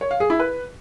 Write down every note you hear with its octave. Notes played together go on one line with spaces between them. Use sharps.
C#5
F5
G#4
E4
B4